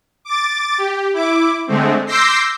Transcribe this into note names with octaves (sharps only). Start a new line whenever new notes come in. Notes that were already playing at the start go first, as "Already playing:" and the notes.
D6 A6
G4
E4 D6
D3 G#3 A3 C4
C6 D6 E6 G6 A#6 C7